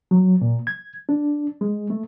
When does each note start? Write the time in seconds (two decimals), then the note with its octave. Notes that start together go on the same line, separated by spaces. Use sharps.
0.11 F#3
0.42 A#2
0.67 G#6
1.09 D4
1.61 G#3
1.90 A3